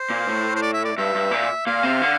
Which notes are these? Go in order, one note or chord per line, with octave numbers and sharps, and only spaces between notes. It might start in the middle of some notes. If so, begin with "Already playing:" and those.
Already playing: C5
A#2
A2
C5
D5
E5
D5
G2 E5
G2
A#2
A#2 F5
C3
D3